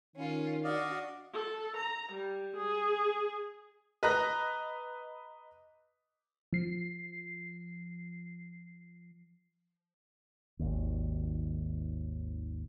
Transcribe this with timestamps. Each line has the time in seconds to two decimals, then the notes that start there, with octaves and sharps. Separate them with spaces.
0.16 D#3 C#4 F4
0.64 D4 F#4 D5 D#5 F5
1.33 A4
1.77 A#5
2.12 G3
2.56 G#4
4.03 B4 D#5 A#5 F#6 A#6
6.53 F3 C7
10.59 G#1 D#2